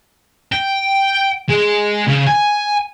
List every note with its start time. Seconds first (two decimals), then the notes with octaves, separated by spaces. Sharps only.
0.52 G5
1.49 G#3
2.07 C#3
2.27 G#5